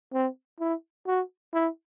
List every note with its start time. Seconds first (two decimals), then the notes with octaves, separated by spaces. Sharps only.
0.13 C4
0.60 E4
1.07 F#4
1.54 E4